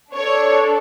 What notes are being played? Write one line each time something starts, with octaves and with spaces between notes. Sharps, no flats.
D4 A4 C#5